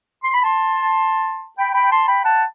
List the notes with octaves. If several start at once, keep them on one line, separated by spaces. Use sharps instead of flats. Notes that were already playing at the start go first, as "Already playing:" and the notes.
C6
B5
A5 C6
G5 B5
G5 B5
A5 C6
G5 B5
F#5 A5